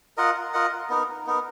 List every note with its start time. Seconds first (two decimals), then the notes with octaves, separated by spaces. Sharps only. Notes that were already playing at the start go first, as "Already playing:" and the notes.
0.17 F4 A#4 D#5 F#5
0.53 F4 A#4 D#5 F#5
0.89 B3 D#4 A#4
1.27 B3 D#4 A#4